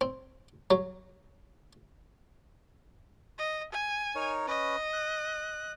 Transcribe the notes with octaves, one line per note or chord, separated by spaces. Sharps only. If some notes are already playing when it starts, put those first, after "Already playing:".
C4
F#3
D#5
G#5
D#4 A#4 C#5
C#4 B4 D#5
F#6